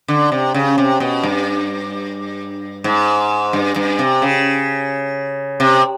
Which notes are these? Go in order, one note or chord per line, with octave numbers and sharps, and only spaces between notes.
D3
C3
C#3
C3
B2
G2
G#2
G2
G2
C3
C#3
C3